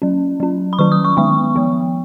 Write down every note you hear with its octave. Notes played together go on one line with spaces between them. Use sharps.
F#3 C#4
F#3 C#4
B5
D#3 F#3 C#4 C#6
D#6
C#6
D#3 G#3 B3 C#6
F3 B3